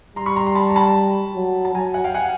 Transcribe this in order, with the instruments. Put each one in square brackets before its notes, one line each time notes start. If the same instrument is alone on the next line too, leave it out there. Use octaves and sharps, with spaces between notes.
[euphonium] G3 [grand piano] A#5 C6
[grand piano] B5 C#6
A#5 C6
A#5 C6
A5 B5
A#5
A5 B5
[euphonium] F#3
[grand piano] A5
[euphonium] F#3 [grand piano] G#5 A#5
[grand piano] F#5 G#5
F5 G5
F#5 G#5